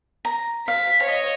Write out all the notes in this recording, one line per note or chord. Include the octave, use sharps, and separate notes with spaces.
A#5
F5 B6
C#5 D#5